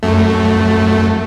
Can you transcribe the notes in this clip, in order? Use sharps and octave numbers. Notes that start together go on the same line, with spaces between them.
F#2 A3